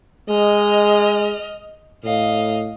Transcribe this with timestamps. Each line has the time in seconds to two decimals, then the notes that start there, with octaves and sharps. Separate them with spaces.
0.29 G#3 D#5 F6
2.04 A2 D#5 F5